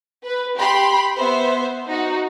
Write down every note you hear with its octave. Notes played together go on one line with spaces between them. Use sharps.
B4
G4 B5 C6
B3 C5 E5
D#4 F#4